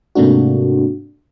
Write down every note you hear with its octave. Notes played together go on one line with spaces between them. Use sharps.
G#2 C3 A3 A#3 D4 F#4